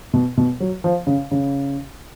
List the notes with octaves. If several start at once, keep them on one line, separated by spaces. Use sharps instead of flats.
B2
B2
F#3
F3
C#3
C#3